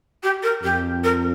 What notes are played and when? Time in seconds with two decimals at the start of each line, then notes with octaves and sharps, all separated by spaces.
0.23 G4
0.43 A#4
0.63 F2 G4
1.03 A#4